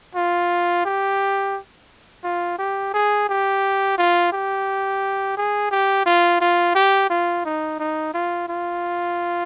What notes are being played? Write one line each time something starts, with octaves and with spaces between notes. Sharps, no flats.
F4
G4
F4
G4
G#4
G4
F4
G4
G#4
G4
F4
F4
G4
F4
D#4
D#4
F4
F4